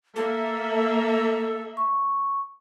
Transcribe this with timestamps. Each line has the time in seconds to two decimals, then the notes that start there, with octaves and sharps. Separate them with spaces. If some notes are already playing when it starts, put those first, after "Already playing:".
0.16 A#3 A4 E5
1.77 C#6